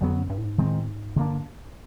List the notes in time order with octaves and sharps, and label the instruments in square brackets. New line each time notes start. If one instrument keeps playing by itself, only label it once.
[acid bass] F2 [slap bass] D3 F#3 B3
[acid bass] F#2
G2
A2
G#2
[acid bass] A2 [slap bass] D#3 G#3 C4
[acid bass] G#2
[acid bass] G2 [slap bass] D3 F#3 A#3 D4